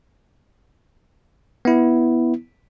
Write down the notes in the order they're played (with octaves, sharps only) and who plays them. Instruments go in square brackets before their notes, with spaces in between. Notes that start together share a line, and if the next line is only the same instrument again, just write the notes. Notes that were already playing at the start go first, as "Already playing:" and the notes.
[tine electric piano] B3 E4